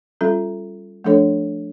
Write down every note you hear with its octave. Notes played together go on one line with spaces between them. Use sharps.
G3 C#4 F4 A4
F3 A3 D4 A4 C#5